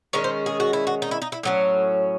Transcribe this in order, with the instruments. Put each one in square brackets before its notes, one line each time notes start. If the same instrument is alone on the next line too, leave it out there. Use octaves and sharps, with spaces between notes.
[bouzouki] D#3 G#3 C#4 C#5
C5
G#4
F#4
E4
F#4
D#4
E4
D#4
E4
A2 F#3 C#4